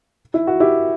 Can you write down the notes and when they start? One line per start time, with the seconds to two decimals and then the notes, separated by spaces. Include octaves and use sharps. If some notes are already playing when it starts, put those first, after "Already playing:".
0.34 E4
0.47 F#4
0.60 E4 G4